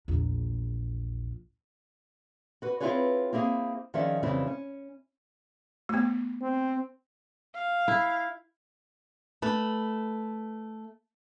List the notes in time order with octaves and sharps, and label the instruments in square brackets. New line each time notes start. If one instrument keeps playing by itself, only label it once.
[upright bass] A#1 E2
[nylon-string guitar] F#4 B4
C4 E4 F4 G#4 B4 C#5
A#3 C4 E4 G#4 C5
D#3 F3 C#4 D4 G#4 E5
F2 C#3 E3 G3 C4 E4
C#4
[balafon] A3 B3
[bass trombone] C4
[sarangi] F5
[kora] E4
[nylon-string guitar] A3 B4